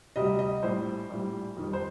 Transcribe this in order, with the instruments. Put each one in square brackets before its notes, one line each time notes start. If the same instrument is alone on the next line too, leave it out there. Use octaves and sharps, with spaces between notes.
[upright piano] D2 C3 G3 D#5
D#5
A#1 A2 G3 C5
A#1 A2 G3
F2 D#3 G3
C5